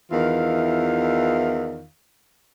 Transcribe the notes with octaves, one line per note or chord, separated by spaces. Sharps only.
E2 D#3 E3 F4 F5